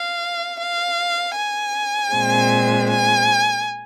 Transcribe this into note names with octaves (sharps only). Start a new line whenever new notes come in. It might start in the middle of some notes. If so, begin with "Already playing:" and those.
Already playing: F5
F5
G#5
A#2 G#3 C4
G#5